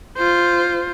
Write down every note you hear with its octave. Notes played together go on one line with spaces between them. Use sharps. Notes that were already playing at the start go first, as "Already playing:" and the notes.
F4 C5